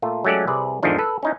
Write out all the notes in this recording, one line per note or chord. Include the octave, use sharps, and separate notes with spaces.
A#2 A3 F4
F#3 G#3 A3 C#4 G4 D5
C2 C3 G#4 B4 D5
E2 G#2 D3 D#3 F3 D4
A4 B4
C#4 D#4 E4